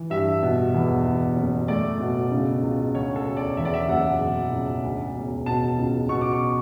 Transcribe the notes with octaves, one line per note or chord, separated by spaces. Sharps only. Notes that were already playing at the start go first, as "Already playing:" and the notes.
Already playing: E3
G2 E5
B2
E2
E2
F#1
A3 D5
B2
C#3
C#2
D2 C#5
A4
E1
D5
E2 E5
D5
E5
F#1 F#5
B2
C#2
D2
E1
B2 A5
C#2
B2 C#6
D6
C#6